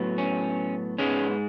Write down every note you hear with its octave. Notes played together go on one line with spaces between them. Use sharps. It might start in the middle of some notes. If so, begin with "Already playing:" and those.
Already playing: A2 F#3 B3
C#4
G#2 G#3 B3 C#4